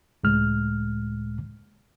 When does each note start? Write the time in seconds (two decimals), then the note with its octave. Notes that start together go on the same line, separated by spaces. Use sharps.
0.24 C#2 A2 G#3 F6